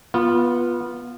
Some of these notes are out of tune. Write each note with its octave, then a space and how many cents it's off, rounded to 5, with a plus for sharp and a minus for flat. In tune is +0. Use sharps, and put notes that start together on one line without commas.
B3 -20 F4 +0